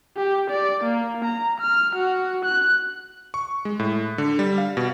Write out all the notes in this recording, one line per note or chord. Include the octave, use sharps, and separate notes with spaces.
G4
D5
A#3
A#5
F6
F#4
F#6
C#6
G#3
A2
D3
G3
F5
B2